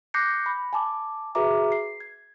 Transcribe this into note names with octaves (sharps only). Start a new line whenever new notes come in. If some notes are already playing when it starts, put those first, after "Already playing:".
D6 F#6 G6 A#6 C7 C#7
B5
G#5 A5 D6
F#4 G#4 B4 E5 A#5 D6
C7
G#6